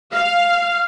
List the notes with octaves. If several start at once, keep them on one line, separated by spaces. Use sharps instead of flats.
F5